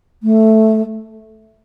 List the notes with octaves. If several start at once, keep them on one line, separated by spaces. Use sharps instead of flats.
A3